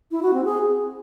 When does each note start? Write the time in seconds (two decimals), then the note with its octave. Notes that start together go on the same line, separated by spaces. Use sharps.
0.11 E4
0.22 F#4
0.34 C4
0.45 G#4